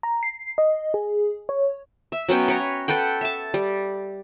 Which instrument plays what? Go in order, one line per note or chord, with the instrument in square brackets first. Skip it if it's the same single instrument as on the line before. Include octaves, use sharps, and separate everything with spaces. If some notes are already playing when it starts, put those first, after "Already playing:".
[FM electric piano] A#5
C7
D#5
G#4
C#5
[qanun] E5
F#3 B3 C#4 G5
B4 C#5 G5 A#5
A4 B4 F#5 G5
E5 A5
G3